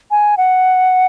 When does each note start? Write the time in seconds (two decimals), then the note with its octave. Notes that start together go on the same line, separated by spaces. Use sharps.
0.11 G#5
0.37 F#5